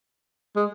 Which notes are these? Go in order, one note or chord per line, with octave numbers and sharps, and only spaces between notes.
G#3